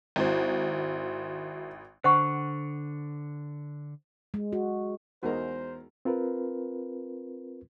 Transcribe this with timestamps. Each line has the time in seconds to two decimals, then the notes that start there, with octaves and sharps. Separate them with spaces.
0.16 G#1 E4 F#4 C5
2.04 D3 C5 F#5 C#6
4.34 G#3
4.53 F#4
5.23 E2 G#3 D#4 F#4 A#4 C5
6.05 C4 F4 A#4 B4